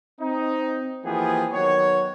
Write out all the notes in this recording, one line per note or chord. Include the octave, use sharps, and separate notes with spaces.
C4 D#4
E3 F3 A#3 B3 G4 G#4
D#3 F#3 B3 F#4 C#5